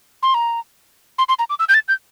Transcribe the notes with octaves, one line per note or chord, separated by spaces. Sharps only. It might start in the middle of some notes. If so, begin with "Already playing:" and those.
C6
A#5
C6
C6
A#5
D6
E6
G6
A6
G6